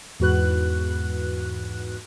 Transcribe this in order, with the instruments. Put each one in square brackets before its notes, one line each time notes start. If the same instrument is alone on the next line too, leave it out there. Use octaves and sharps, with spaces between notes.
[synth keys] E2 G#2 F#4 B4 F#6